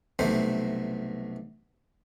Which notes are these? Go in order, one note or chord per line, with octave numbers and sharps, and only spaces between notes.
B1 G2 C3 A3 C5